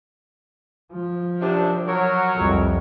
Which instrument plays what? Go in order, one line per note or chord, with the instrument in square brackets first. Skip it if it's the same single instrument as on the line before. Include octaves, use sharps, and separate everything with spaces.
[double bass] F3
[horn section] F#2 C3 D4
F#3 A#4 C#5
[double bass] C2 F2